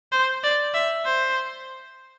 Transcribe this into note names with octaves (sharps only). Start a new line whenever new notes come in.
C5
D5
E5
C5